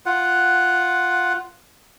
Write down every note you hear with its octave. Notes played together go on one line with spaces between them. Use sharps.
F4 F#5